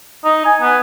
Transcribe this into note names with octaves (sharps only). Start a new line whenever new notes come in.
D#4
G#5
B3